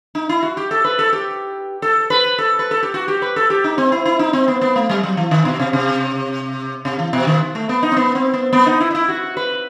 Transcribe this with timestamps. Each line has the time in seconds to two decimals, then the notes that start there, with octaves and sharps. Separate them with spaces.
0.15 D#4
0.29 E4
0.43 F#4
0.57 G4
0.71 A4
0.84 B4
0.99 A4
1.13 G4
1.82 A4
2.10 B4
2.38 A4
2.59 B4
2.71 A4
2.83 G4
2.94 F#4
3.08 G4
3.22 B4
3.36 A4
3.50 G4
3.64 D#4
3.78 C4
3.92 E4
4.05 E4
4.19 D#4
4.33 C4
4.48 B3
4.61 B3
4.76 A3
4.90 G3
5.03 F#3
5.17 E3
5.31 D#3
5.45 B2
5.60 C3
5.73 C3
6.85 C3
6.99 E3
7.13 B2
7.27 D#3
7.55 A3
7.69 B3
7.83 D#4
7.92 C4
7.97 B3
8.15 C4
8.34 B3
8.53 B3
8.66 D#4
8.80 E4
8.90 D#4
8.95 E4
9.08 F#4
9.37 B4